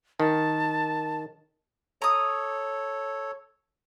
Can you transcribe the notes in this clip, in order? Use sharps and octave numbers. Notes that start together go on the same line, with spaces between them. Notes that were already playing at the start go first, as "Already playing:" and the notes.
D#3 A5
A4 C#5 A#5 D#6